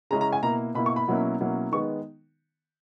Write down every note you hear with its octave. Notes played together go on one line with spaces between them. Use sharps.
C#3 G#3 C#4 E4 A#5
A#5
G#5
B2 A#3 E4 A#5
B2 A#3 E4 B5
C#6
B5
B2 F#3 A#3 C#4 E4
B2 F#3 A#3 C#4 E4
D#3 G#3 B3 C#6